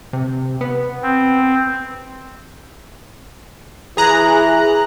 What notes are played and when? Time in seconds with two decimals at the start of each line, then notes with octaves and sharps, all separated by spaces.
0.13 C3
0.61 B3
1.03 C4
3.97 E3 G#4 A#5 F#6